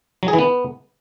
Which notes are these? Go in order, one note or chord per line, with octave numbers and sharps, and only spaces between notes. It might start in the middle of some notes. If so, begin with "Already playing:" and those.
F#3
G#4
E3
B3